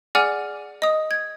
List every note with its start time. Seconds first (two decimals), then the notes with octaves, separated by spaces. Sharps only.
0.15 G#4 D5 F#5 G#5 D6 F6
0.82 D#5 D#6
1.11 G#6